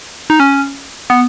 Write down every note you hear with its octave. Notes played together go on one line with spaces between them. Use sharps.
D#4
C#4
B3